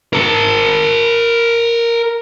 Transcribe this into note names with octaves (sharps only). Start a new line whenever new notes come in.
A#4 A5